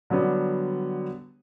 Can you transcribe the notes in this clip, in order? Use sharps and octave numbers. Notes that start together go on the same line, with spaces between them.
D3 F#3 G3 B3